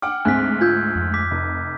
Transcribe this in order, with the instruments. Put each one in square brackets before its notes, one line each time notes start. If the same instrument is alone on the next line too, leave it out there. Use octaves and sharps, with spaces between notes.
[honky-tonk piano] F#5 G5 D6 [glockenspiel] F6
[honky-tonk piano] D2 G#2 [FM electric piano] C4 G#5 [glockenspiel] F#6 B6
[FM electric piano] F4 [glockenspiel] E6 G6 G#6
[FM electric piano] F2
[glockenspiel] D6 B6
[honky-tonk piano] F1